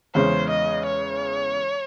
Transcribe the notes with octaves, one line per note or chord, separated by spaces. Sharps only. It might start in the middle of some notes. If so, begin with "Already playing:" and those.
E2 C#3 G#3 C#4 C5
D#5
C#5